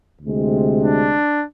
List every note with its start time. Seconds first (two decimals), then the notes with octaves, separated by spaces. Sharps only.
0.21 D2 C3 G#3
0.81 D4